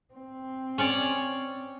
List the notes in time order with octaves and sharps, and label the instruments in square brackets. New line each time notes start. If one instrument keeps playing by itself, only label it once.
[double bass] C4
[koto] C#4 C#5 D5